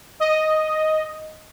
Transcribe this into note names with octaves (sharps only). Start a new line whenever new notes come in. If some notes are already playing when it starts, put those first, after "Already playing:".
D#5